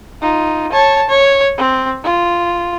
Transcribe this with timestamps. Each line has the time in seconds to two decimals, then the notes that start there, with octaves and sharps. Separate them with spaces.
0.22 D#4 F4
0.72 C#5 A5
1.09 C#5
1.58 C4
2.04 F4